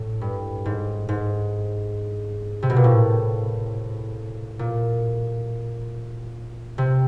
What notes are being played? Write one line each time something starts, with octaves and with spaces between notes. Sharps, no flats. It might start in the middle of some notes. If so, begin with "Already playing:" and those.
Already playing: A2
G2
G#2
G#2
C3
B2
A#2
A2
A#2
C3